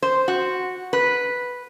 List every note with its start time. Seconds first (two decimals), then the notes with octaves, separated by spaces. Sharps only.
0.02 C5
0.28 F#4
0.93 B4